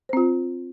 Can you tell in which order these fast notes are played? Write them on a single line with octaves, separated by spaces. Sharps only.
C5 C4 F4